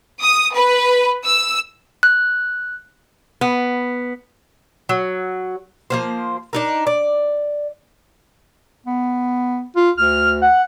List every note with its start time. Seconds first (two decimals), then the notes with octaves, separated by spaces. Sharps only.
0.21 D#6
0.54 B4
1.25 E6
2.03 F#6
3.41 B3
4.89 F#3
5.90 F3 A#3 C5
6.53 D4 D#4 A#4
6.87 D5
8.86 B3
9.76 F4
9.97 D2 F6
10.42 F#5